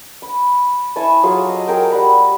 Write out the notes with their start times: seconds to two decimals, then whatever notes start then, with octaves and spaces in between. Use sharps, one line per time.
0.22 B5
0.96 E4 G#5 A5 C#6
1.23 F#3 F4 G#4 A4
1.49 D#5
1.68 G#4 A#4 G5
1.92 G3 F#5 B5